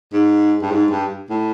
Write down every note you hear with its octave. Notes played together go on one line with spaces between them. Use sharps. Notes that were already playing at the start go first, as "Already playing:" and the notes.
G#2
G2
G#2
G2
A2